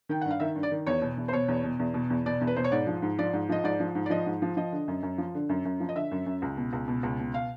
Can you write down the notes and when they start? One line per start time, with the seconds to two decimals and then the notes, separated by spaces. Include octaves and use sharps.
0.09 D#3 G5
0.21 G2 F#5
0.30 F5
0.40 D#3 E5
0.56 G2
0.63 D5
0.71 D#3
0.87 E2 C#5
1.02 B2
1.17 E2
1.28 C5
1.33 B2 C#5
1.48 E2
1.63 B2
1.79 E2
1.94 B2
2.10 E2
2.26 B2 D5
2.41 E2
2.47 B4
2.56 B2 C5
2.64 C#5
2.72 G#2 D5
2.87 F3
3.02 G#2
3.18 F3 D5
3.33 G#2
3.49 F3 D#5
3.64 G#2 D5
3.80 F3
3.95 G#2
4.06 D5
4.10 F3 D#5
4.26 G#2
4.42 F3
4.57 F3 D#5
4.72 D3
4.88 F#2
5.03 F#2
5.18 F3
5.34 D3
5.49 F#2
5.65 F#2
5.80 F3
5.89 D#5
5.95 D3 E5
6.11 F#2
6.26 F#2
6.42 C#2
6.57 B2
6.73 C#2
6.88 B2
7.03 C#2
7.20 B2
7.34 F5